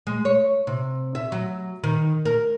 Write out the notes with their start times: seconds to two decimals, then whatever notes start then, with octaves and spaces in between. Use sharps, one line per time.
0.07 G#3
0.25 C#5
0.67 C3
1.15 E5
1.32 F#3
1.84 D#3
2.25 A#4